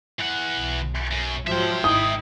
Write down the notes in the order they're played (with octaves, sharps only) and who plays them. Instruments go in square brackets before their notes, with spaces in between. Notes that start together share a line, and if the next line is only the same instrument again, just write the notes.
[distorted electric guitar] E3 F#5
[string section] B1
[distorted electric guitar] F#2
[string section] G#2 F3 F#3 [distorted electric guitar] E5 G5
[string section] G#1 D#4 E4 [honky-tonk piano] D#6